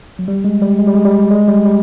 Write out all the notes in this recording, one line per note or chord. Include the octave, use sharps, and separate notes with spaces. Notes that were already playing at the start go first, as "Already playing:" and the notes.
F#3
G3
G#3
G3
G#3
G3
G#3
G3
G#3
G3
G3